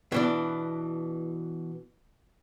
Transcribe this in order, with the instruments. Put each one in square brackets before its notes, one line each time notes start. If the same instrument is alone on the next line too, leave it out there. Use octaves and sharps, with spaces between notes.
[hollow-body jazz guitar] B2 E3 D4